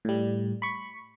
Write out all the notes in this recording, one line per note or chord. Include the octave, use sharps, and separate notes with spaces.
A2 G3
B5 C#6